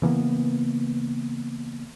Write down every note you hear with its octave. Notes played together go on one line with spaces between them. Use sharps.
C#3 E3 A#3 B3